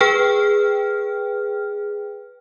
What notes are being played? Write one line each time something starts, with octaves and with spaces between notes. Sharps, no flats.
G#4 B4 G5 F6